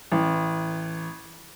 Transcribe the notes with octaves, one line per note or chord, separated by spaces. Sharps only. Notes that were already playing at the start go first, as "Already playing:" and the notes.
A1